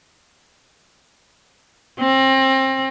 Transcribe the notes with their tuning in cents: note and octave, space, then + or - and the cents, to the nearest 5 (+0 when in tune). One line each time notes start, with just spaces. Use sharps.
C4 +30